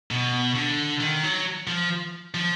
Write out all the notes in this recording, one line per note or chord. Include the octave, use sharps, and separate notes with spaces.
B2
D3
D#3
F#3
F3
F3